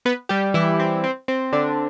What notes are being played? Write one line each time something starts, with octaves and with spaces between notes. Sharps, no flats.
B3 B4
G3 G4
E3 E4
C4
C4
C4
D3 D4